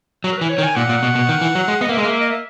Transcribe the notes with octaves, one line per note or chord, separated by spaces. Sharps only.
F#3
A#4
E3 B4
C#5
D#3
G#5
A#2 F#5
A#2
B2
B2
D#3
E3
F#3
G#3
B3 D#5
A#3 E5
G#3
A#3 D#5
E5
D#5
E5